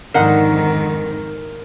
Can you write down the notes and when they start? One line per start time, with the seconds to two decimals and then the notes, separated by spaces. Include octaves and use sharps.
0.14 F2 G#2 D3 D#3 D#4 A#4 F#5